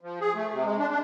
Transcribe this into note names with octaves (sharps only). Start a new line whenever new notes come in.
F3
G#4
A3
C3
G#3
D4
D4